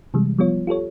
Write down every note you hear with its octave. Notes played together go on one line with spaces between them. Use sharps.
C3 E3 G3 G#3
F3 G3 B3 F4 C#5
F4 G4 A4 C#5